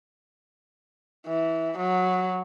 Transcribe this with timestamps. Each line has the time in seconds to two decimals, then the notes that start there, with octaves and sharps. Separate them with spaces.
1.27 E3
1.78 F#3